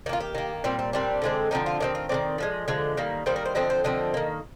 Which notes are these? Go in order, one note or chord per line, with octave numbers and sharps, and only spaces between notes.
D#3 A#3 F4 G4
G4
D#3 A#3
A#2 G3 C4
C4
A#2 G3 C4 D4
D3 F3 G#3 C4
D3 F3 G#3 C4 D#4
F4
D#3 G#3 C4 G4
F4
D#3 G#3 C4 D5
D3 F3 G#3
D3 F3 G#3
D#3 G3 A#3
D#3 G3 A#3 C5
A#4
C5
D3 F3 C4 D#5
C5
D3 F3 C4 D#5
D#3 A#3